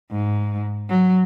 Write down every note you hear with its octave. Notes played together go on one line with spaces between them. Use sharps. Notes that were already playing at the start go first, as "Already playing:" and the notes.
G#2
F#3